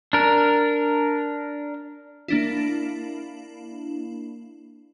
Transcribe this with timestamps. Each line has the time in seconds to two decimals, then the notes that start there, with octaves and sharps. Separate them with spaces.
0.13 D4 A#4
2.28 A#3 D4 E4